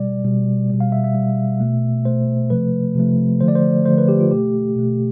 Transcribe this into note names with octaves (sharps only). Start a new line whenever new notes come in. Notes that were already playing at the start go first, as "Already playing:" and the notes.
Already playing: B2 G3 D5
B2 G3
B2 G3
F5
E5
E5
B2 G3
B2 A3
B2 A3 C5
C3 F3 A3 B4
C3 F3 A3
D3 F3 A3 C5
D5
C5
D3 F3 A3 C5
B4
G4
F4
B2 A3 G4
B2 A3